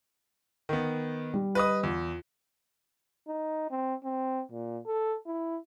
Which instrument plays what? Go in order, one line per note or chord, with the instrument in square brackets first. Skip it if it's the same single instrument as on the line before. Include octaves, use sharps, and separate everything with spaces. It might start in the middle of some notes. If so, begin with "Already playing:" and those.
[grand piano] D#3 B3
[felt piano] G3
[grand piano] B4 D#5 D#6
[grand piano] E2 [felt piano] F4
[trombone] D#4
C4
C4
A#2
A4
E4